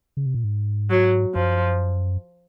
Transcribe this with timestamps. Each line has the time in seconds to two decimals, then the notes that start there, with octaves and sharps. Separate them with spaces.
0.17 C#3
0.26 C3
0.34 A#2
0.44 G#2
0.90 F#3
1.35 F#2 F3